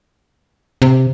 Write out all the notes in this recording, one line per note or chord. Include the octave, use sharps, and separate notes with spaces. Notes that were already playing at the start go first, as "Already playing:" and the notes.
C3